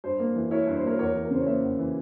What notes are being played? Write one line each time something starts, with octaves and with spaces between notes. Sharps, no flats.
G2 C5
A#3
E3
E4 A#4 C#5
G2
C5
A#3 A#4 C#5
E2 A#4 C#5
E3
A#4
C#3 C5
C#5
A#3 C5 E5
E2
E3